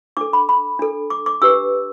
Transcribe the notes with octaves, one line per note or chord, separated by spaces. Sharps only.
D4 A4 D6
B5
B5
D4 A4
D6
D6
D4 G4 B4 E6